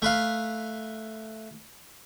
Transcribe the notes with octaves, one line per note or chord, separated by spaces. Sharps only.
A3 B4 F5